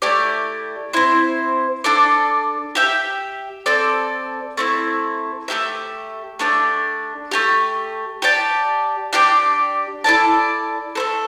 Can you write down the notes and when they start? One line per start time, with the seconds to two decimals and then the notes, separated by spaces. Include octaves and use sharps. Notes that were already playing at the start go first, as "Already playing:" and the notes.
0.02 A3 E4 G4 D5
0.93 C4 E4 C5
1.84 D4 A4 D5
2.75 G4 E5 G5
3.66 C4 A4 D5
4.57 A3 C4 E4
5.48 A3 E4 G4 E5
6.39 A3 D4 G4 D5
7.31 A3 D4 G4
8.22 G4 D5 A5
9.13 D4 G4 D5 G5
10.04 E4 A4 D5 A5
10.95 C4 A4
11.00 A3